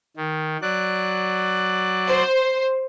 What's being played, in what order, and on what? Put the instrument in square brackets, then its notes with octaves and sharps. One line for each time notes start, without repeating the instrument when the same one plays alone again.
[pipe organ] D#3
F#3 D5 F#6
[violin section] C5